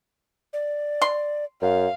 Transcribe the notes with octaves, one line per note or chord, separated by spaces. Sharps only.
D5
C6
F#2 F5